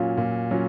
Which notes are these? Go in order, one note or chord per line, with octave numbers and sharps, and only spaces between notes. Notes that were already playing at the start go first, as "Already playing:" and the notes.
Already playing: A#2 F#3 C#4 F4
A#2
F#3 C#4 F4